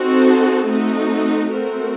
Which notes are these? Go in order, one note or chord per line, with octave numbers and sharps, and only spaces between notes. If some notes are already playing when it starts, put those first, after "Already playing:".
Already playing: C4 D#4 F#4 A4
A3 C4 D#4 F#4
A3 C4 F#4 A#4